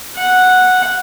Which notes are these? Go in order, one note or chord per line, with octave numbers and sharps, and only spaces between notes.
F#5